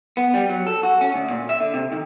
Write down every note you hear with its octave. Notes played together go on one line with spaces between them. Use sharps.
B3
G3
F#3
A4
F#4
C#4
D2
A#2
E5
D3
C3
D#3